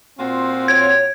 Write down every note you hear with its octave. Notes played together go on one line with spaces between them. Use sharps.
A#2 C4 F4 F#4
C#5 G#6